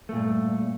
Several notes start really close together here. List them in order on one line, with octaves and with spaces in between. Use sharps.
A3 A#2 G2